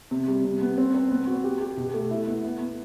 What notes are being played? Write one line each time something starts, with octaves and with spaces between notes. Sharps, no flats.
C3
G3
C3
B3
C4
C4
B3
F#4
G4
G4
B2
A3
E4
B3
B3
B3